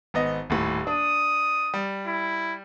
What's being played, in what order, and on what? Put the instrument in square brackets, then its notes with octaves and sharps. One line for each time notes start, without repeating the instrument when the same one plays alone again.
[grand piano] G#1 B3 D#5
D#1 A2
[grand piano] D4 [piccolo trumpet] D#6
[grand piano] G3
[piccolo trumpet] E4